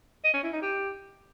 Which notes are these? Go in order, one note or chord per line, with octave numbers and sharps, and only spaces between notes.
D#5
C#4
E4
D#4
G4